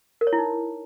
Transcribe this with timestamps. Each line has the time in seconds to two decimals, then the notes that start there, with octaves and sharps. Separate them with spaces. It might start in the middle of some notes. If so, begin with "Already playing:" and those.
0.21 A#4
0.27 C#5
0.33 E4
0.38 D#4